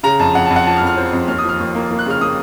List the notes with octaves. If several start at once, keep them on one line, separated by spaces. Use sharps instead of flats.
C#3 A#5
F2 A5
F2 F#5
A5
F2
F#5
F3 A5
F6
F2
F6
C4
F2
D#2 F6
D#6
F3
F6
D#2
A#3
A#3
F#6
C#3 F6
A#3 D#6